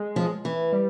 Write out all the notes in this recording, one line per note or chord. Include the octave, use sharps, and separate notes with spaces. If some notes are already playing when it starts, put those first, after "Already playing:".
Already playing: G#3
F3
E3
G3